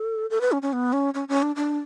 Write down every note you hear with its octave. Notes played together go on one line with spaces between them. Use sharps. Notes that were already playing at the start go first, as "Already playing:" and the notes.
Already playing: A4
A4
B4
C#4
C#4
B3
C#4
C#4
C#4
D4
D4